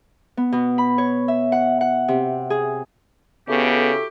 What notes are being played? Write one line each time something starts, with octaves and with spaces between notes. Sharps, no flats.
B3
B2
B5
C#5
E5
F#5
F#5
C3
G#4
C#3 B3 E4 F#4 G4 A4